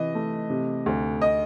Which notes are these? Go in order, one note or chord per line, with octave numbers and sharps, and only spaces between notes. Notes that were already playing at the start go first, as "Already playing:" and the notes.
Already playing: C3 E3 D#5
A3
C3
D2
D#5